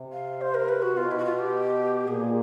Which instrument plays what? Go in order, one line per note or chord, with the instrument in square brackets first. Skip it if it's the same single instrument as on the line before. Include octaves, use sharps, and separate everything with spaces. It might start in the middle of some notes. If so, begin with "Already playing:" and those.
Already playing: [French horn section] C3
[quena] F5
C5
A#4
B4
F#4
[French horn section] B2 [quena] F4
[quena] E4
F#4
F4
G4
[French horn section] A#2 [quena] G#4